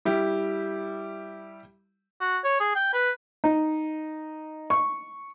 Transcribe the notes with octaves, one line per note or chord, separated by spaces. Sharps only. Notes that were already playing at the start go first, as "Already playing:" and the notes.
G3 E4 G4
F#4
C#5
G#4
G5
B4
D#4
C#6